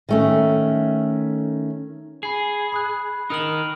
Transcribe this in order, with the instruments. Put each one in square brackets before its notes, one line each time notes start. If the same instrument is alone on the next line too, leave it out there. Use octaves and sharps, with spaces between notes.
[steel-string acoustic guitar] D#3 A3 C#4
[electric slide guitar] G#4 [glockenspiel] B5 C7
[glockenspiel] B5 D#6 F#6
[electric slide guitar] D#4 A#4 [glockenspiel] D#6 F6 F#7